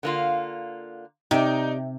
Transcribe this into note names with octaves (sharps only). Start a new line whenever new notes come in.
D3 A#3 F4
C3 D#4 G4 D5